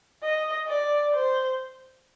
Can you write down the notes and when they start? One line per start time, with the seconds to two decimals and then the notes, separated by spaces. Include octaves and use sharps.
0.23 D#5
0.68 D5
1.14 C5